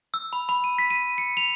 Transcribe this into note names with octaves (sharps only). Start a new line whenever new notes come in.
E6
B5
B5
D#7
B6
D#7
C#7
F7